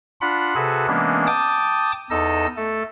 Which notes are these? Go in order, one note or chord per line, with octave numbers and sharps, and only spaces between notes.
D4 F4 F#5 B5
C3 F#4 G#4 A4 B4
E3 G#3 A#3 B3 C#4 D4
G5 A5 D6 D#6
E2 D#4 A4 D#5 E6
A3 A4